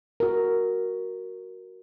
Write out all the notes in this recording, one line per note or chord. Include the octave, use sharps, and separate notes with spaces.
F#4 A#4